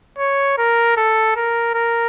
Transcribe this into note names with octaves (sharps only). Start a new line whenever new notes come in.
C#5
A#4
A4
A#4
A#4